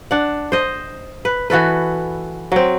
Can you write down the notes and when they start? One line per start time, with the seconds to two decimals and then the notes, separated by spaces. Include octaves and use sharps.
0.11 D4 F#5
0.52 C5 D#5
1.25 B4
1.50 E3 F#4 A4 B4
2.52 F#3 C4